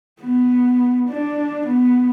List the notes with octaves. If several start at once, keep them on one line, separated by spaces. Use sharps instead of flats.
B3
D4
B3